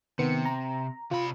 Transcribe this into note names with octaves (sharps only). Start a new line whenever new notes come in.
C3 D#3 B3 C#7
A#5
C3 F4 B5